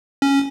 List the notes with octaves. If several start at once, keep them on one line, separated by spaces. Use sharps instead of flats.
C#4